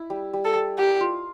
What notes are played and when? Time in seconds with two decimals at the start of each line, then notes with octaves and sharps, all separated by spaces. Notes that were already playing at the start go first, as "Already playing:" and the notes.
Already playing: E4
0.10 G3
0.33 G3
0.45 A4
0.55 G3
0.78 G4 A#4
1.01 F4